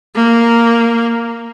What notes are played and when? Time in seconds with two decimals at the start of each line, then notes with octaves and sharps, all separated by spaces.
0.15 A#3